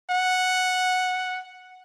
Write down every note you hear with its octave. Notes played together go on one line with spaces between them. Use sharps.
F#5